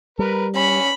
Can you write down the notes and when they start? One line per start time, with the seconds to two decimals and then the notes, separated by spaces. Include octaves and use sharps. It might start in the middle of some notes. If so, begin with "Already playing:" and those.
0.19 G3 A#4 B4
0.55 C#4 B5